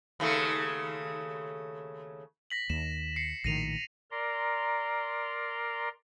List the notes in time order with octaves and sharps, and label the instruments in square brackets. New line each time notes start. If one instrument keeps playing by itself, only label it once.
[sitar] D#2 C#3 A3
[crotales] A#6 B6 F#7
[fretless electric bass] D#2 [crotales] E7
[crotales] C7 C#7
[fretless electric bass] A#1 A2 D#3 [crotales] A#6 D#7 F7
[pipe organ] A#4 D5 A#5 C6